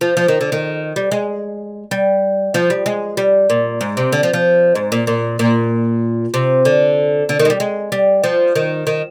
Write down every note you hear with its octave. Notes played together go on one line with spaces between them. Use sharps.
F3
F3
D#3
D3
D#3
G3
G#3
G3
F3
G3
G#3
G3
A#2
G#2
C3
D3
F3
F3
G#2
A#2
A#2
A#2
C3
D3
D3
D#3
G#3
G3
G#3
G3
F3
D#3
D#3